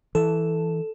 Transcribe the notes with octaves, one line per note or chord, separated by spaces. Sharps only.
E3 A4